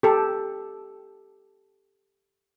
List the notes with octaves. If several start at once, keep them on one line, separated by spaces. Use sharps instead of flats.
G4 A4